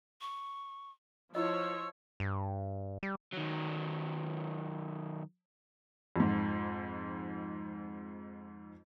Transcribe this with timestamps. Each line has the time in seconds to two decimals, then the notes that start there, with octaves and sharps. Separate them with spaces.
0.21 C#6
1.35 F3 E4 F4 C#5 D#5 E6
2.20 G2
3.03 G3
3.33 D#3 F#3
6.16 F2 G#2